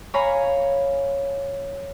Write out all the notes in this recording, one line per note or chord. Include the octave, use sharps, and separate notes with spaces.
C#5 F5 G#5 A#5 B5